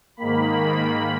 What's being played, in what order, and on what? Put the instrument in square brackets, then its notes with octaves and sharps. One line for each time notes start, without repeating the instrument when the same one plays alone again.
[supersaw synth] G#2 D#3 A#3 B5